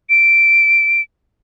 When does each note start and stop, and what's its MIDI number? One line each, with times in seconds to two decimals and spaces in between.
0.10 1.01 98